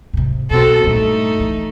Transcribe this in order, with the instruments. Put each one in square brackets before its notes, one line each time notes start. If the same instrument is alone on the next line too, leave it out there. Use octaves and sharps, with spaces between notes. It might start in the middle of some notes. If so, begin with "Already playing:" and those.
[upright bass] G#2 C3
[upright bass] B2 E3 [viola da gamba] C4 F#4 A4
[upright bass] G2 A#2 [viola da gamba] A3 D#4
[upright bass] E3